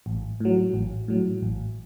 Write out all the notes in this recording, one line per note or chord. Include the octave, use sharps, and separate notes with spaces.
A1
A2 F#3
A1
A2 F#3
A1